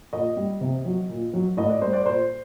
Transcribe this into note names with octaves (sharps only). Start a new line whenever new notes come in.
A#2 D#5
G3
C3
F#3
A#2
F#3
A2 D#5
D5
G3 C5
D5
A#2 C5